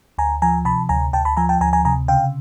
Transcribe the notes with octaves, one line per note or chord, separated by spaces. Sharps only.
D2 G#5 A#5
F3 G#5 A#5
C3 A5 B5
D2 G#5 A#5
D2 G5 A5
A5 B5
F3 G#5 A#5
G5 A5
D2 G#5 A#5
G#5 A#5
C3 G#5 A#5
C#3 F5 G5